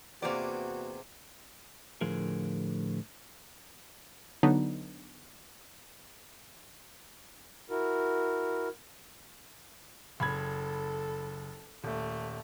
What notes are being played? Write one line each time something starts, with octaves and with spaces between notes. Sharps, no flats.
E2 C3 A#3 B3 F#4 D5
A2 D3 F3 G#4 A#4
D3 F#3 B3 D4 D#4
E4 F#4 A#4
F#1 A4 B5 G#6
D#1 A3